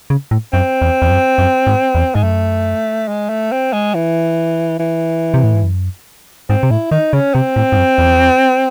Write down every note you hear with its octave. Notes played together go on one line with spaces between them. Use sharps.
C#3
A2
F#2 C4
E2
E2
F#2
F#2
G#2
E2
G#2 G#3
F#2 A3
G#3
A3
C4
G#3
E3
E3
C3
A2
G#2
F#2
G#2 C4
C3
A2 E4
D#3 D#4
C#3 C#4
C3 C4
A2
G#2
F#2
E2